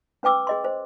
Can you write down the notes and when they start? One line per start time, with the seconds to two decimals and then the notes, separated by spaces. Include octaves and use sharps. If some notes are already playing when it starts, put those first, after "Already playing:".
0.23 C#4 B4 G5 D6 E6
0.47 G#4 D#5 C6
0.64 C5